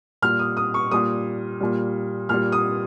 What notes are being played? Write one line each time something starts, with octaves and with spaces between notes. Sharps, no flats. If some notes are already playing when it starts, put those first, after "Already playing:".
A#2 G3 F6
D#6
D#6
C#6
A#2 G3 D#6
A#2 G3
A#2 G3 F6
D#6